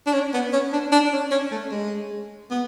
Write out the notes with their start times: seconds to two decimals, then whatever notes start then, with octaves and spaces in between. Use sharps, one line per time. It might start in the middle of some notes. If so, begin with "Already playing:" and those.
0.06 D4
0.13 C#4
0.33 B3
0.53 C#4
0.73 D4
0.92 D4
1.12 C#4
1.31 C#4
1.51 A3
1.71 G#3
2.50 B3